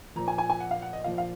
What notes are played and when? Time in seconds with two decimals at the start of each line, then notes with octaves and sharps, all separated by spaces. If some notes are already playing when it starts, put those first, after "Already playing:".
0.16 A#2 F3 A#5
0.28 G#5
0.38 G#5
0.50 G#5
0.60 F#5
0.71 F5
0.82 F#5
0.93 D#5
1.04 A#2 F3 F5
1.18 F5